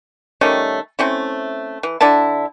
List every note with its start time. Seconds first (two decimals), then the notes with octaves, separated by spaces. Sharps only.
0.41 D#3 G3 A3 C#4
0.99 A3 C4 C#4 E4
1.83 E3
2.01 D3 D4 E4 A5